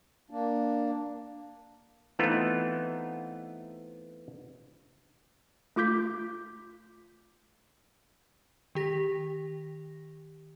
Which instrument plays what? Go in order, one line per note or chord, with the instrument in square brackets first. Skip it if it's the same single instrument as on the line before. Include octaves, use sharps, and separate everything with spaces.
[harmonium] A#3 D4
[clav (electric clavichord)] E3 A3 B3 C4 D#4 F4
[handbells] A3 F4 D6 G6 B6
[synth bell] D#3 G4 A#6